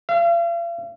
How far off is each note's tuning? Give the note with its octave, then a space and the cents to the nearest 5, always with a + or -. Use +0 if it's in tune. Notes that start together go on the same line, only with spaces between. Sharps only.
F5 -40